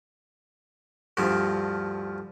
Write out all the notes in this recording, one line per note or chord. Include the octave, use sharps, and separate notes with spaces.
D2 G2 F3